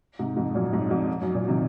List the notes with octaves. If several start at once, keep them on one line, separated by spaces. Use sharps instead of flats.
G#2 C3
F2 G#2
F#2 A#2
F2 G#2
F2 G#2
F#2
F#2 A#2
C3 D#3